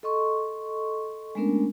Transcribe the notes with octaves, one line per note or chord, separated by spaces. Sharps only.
A4 D#5 C6 C#6
G#3 A3 B3 C#4 D4 A#4